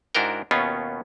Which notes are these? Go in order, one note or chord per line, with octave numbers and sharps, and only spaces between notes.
G#2 D4 E4 F#4 A#4 G5
D#2 B2 B3 C#4 F4